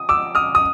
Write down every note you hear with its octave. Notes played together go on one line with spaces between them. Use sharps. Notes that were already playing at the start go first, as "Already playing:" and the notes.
Already playing: D#6
D6 E6
D#6 F6
D#6